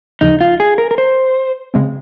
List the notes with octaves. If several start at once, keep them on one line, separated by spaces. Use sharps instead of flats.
D#2 C#3 F3 D#4
F4
G#4
A#4
A#4
C5
C#3 G#3 C4